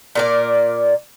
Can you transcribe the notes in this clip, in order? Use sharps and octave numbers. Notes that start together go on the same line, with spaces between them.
A#2 A#4 D5